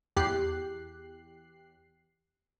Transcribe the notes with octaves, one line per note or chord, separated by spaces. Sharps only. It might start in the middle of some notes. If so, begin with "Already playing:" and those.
E2 G4 F#6 C7